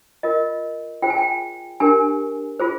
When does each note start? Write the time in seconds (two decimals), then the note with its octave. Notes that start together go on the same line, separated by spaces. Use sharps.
0.23 F4 A#4 D#5
1.02 F4 G#4 C5 G5
1.10 G#5
1.18 G5
1.80 D4 G4 A#4 G#5
2.60 F4 G#4 C5